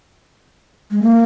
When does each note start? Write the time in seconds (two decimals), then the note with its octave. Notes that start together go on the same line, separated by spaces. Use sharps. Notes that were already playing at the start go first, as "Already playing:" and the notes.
0.91 G#3
1.02 A#3